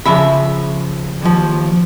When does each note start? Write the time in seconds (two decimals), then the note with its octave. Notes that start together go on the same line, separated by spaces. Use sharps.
0.06 C#3 F3 E5 B5
1.22 D#2 F3